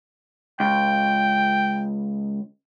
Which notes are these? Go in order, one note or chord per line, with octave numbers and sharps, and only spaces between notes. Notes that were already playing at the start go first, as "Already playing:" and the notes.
C#2 G5